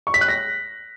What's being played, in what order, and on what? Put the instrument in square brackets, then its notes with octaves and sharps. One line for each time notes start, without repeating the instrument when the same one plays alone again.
[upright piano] C#6
B6
F#6
A#6